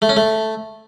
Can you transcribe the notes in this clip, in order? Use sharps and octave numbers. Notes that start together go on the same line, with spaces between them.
A3
C#4
A3